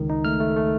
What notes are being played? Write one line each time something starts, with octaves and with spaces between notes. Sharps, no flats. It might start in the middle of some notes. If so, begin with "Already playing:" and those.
Already playing: C#2 D#3
D#4
A3 F6
A3
A3